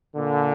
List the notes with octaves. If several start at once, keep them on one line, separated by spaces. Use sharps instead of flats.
A#2 D3